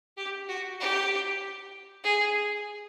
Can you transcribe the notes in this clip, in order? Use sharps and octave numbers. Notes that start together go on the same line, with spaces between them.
G4
F#4
G4
G#4